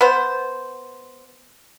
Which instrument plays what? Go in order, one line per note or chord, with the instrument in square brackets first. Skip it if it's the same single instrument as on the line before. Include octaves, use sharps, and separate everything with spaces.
[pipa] B3 C5